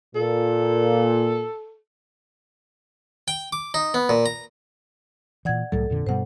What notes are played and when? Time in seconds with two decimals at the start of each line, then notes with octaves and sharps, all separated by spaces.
0.16 A#2 A4
3.28 G5
3.53 D6
3.74 D#4
3.94 B3
4.09 A#2
4.26 A#5
5.45 A#2 E3 D5 F#5 G#6
5.72 C2 A2 F#3 A4
5.90 F2 A#2 D3
6.07 G2 B2 G3 C5 F#5